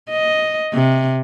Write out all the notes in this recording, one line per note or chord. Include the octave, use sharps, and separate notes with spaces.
D#5
C3